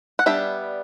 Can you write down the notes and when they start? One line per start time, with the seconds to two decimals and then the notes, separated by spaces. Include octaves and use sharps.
0.19 F#5
0.26 G3 B3 D4 E5